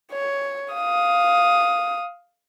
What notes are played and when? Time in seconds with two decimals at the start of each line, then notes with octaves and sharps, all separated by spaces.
0.12 C#5
0.74 F5 D#6